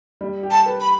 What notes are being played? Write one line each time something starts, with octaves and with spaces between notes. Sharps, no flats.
G3
G4
A5
B4
B5